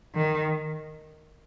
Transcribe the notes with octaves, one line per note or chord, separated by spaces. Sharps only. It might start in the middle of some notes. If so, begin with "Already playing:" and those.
D#3